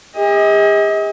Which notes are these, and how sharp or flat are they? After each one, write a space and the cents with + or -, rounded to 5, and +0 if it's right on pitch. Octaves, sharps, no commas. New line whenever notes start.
G#4 -45 D#5 +40